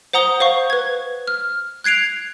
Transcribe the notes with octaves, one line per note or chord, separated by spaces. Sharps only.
C5 F#5 A#5 D#6 G7
C5 F5 C#6
B4 G#6
F6
F#6 G#6 C7 D7 F7